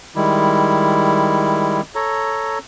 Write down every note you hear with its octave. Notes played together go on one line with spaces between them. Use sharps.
D#3 G3 G#3 E4
A4 C#5 A#5